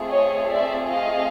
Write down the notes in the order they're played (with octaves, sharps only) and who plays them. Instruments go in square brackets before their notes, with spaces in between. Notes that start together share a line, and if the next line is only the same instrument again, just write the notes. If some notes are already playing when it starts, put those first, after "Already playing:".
Already playing: [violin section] A3 C4 F4 G#4
C#5 D#5
D5 E5
D#5 F5